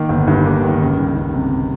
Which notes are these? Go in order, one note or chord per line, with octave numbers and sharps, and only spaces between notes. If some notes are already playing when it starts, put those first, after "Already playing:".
Already playing: D#3 A#3
G1
G2
A#3
D#3
C#2
G3
C#2
C3